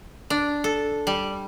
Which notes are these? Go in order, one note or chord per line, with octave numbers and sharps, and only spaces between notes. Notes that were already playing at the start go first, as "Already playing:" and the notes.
D4
A4
G3